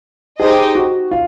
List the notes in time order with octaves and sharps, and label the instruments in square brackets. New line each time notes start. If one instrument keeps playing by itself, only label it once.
[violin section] D#4 G4 C5 D#5 [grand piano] G#4
[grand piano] F#4
F4